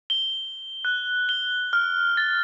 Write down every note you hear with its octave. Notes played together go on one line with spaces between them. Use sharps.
G7
F#6
G7
F6
A6